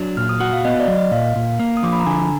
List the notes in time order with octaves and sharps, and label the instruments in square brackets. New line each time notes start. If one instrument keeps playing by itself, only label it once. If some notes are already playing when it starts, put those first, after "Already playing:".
Already playing: [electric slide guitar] F#3 D4
[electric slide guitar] A#2 [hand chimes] F6
[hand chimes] D#6
[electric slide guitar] F#4 [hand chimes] F#5
[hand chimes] F5
[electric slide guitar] B3 [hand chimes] D#5
[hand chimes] D5
[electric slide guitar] F#3
[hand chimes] D#5
[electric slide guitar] A#2 [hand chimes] F5
[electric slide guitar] A#2
A#3
[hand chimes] D#6
[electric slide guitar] F3 [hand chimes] D6
[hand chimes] B5
A#5
[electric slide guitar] D3 [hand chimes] G#5